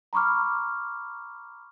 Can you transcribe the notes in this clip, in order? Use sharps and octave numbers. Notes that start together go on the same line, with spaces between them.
A#5 B5 C#6 D6 F6